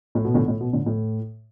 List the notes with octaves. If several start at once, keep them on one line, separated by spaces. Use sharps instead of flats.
A2
B2
A2 D3
A2
B2
A2 D3
A2